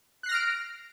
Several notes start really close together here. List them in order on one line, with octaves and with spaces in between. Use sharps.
F#6 C7 A#6 F6 D7